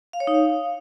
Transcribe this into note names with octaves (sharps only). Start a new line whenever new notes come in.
F5
C#5
D#4
F5